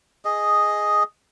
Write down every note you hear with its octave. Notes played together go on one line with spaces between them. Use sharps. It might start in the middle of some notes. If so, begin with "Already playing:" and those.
G#4 D#5